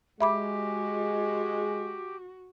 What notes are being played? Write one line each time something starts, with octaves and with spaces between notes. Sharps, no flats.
G#3 F#4 G4 E5 B5 D6